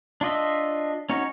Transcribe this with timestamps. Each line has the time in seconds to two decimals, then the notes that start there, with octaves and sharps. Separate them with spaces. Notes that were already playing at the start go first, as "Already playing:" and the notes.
0.21 D4 F4 D#5 E5
1.10 C#4 D#4 F#4 C#5